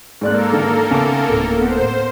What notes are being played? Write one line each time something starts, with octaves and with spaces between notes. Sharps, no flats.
G#2 A#3 A4 A#4 D5 F#6
G#1 D3
C#3 B3 C#4 A5 D6
D1 A2
B3 C5